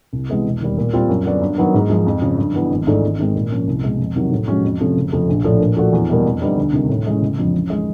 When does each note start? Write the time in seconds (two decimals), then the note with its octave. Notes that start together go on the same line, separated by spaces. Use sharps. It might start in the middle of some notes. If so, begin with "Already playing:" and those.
0.13 C2
0.29 C3 E3 G#3 B3
0.45 E1
0.61 D#2 D#3 G3
0.78 A#2
0.93 G3 C4 F4
1.09 F#2
1.26 D3 F#3 B3 D4
1.41 G2
1.58 D#3 F#3 B3
1.74 G#2
1.90 F3 G#3
2.06 F2
2.22 C#3 F3
2.39 G2
2.54 E3 G3 B3
2.71 G#1
2.87 G#2 E3 A3 D4
3.03 G#1
3.19 G#2 D#3 G#3 C4
3.35 A#2
3.51 F3 A#3 C#4
3.68 C2
3.84 B2 G#3
3.99 F2
4.16 C3 D#3 F#3
4.32 A2
4.48 F3 G#3 C#4 F#4
4.64 F2
4.80 C3 F3 A3 C#4
4.97 F#1
5.12 F2 C3 F3 A3
5.29 A#1
5.44 A2 F3 A3 D4
5.60 A#2
5.77 F3 A3 D4 F#4
5.93 E2
6.10 B2 G3 A#3
6.25 F2
6.41 D3 G3 B3 D#4
6.58 D2
6.73 C3 D#3 G3
6.89 A2
7.06 E3 G#3 C#4
7.22 F#1
7.38 F2 D3 F3
7.54 A1
7.70 D#3 G#3